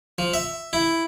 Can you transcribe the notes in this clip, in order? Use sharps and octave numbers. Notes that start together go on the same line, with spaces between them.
F3
E5
E4